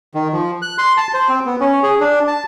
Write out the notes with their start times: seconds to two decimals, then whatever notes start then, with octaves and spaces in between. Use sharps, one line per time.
0.15 D#3
0.33 F3
0.62 F#6
0.78 C6
0.97 A5
1.14 C5
1.29 C4
1.46 B3
1.61 C#4
1.83 G#4
2.00 D4
2.28 A5